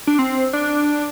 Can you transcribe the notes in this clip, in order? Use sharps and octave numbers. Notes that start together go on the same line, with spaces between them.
D4
C4
D4